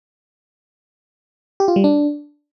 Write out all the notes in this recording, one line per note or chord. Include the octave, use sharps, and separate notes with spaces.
G4
F4
G3
D4